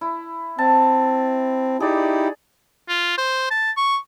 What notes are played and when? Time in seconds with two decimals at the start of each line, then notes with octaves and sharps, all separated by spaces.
0.01 E4
0.58 C4 A5
1.80 D#4 E4 G4 G#4 D5
2.89 F4
3.18 C5
3.50 A5
3.77 C#6